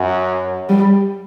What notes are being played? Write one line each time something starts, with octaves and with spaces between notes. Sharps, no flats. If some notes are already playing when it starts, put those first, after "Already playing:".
Already playing: F#2
G3